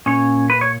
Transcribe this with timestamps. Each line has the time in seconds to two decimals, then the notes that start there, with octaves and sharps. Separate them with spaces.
0.06 A#2 C#4 C#5
0.50 B4
0.61 C#5